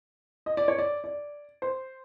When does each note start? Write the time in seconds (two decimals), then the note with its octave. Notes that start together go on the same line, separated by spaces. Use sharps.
0.46 D#5
0.57 D5
0.68 C#5
0.78 D5
1.04 D5
1.62 C5